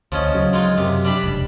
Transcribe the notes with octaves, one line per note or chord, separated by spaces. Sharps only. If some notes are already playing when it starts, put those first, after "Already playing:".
D2 F3 C#4 D#5
C#3 F#3
G#3 D#4 F4
F#2 C3
G3 D4 B5
F1 C#2